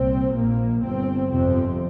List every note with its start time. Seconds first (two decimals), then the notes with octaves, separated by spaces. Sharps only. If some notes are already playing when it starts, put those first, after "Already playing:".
Already playing: C2 A#2 C4
0.37 A#1 A#2 A#3
0.83 G1 G2 C4
1.31 G1 F2 C3 C4